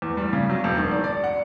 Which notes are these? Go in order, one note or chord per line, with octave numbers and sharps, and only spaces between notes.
E2
G3
C#3
F#3
E1
D#3
D5
D5
F#5